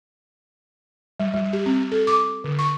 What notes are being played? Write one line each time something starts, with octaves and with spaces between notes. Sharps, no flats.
G3
G3
G4
C4
A4
D6
D3
C#6